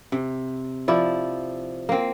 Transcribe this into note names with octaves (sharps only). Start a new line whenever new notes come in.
C3
F3 E4 D5
A#3 C4